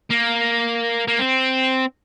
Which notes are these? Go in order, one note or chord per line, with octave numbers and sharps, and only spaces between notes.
A#3
A#3
C4